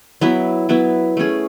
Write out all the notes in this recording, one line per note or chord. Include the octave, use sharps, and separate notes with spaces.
F#3 B3 E4 B4
F#3 B3 E4 B4
A3 C#4 G#4